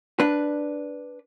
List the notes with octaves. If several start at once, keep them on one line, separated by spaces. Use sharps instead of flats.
D4 B4